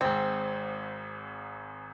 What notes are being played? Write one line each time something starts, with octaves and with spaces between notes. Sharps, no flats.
G#1 G#2 C4